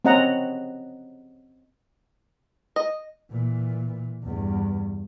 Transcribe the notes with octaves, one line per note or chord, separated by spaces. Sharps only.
C4 C#4 D#5 F#5 A#5
D#5
A#2 E3
E2 G2